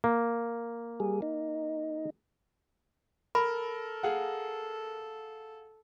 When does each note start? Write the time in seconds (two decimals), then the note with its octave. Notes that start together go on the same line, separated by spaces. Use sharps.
0.04 A#3
1.00 G3 G#4
1.22 D#4
3.35 A4 A#4 B5
4.03 G#4 F5 F#5